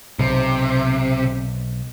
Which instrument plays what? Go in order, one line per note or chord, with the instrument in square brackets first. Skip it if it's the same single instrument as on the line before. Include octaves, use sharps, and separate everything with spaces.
[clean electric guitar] B1 [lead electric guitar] C3